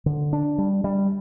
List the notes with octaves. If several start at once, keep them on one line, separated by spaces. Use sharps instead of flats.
D3
D4
G3
G3